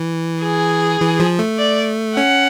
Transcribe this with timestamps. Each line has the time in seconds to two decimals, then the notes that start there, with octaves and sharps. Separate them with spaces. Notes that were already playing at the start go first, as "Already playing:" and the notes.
Already playing: E3
0.42 G#4
1.01 E3
1.20 F3
1.39 A3
1.58 D5
2.16 C#4 F#5